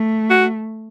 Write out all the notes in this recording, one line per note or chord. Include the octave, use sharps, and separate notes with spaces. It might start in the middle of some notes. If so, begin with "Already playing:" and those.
Already playing: A3
F#4